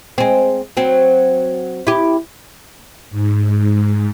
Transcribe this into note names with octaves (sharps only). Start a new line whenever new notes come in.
G#3 C4
F#3 C4
E4 G4
G#2